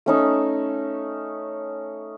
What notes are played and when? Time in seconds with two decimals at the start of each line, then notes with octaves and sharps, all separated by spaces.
0.06 A3 C#4 D#4